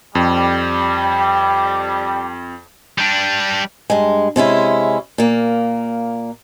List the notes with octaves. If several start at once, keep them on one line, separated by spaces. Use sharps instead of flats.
F2 G3
G3 D4
G2 G#3
C3 G#3 C#4 E4
A#2 A#3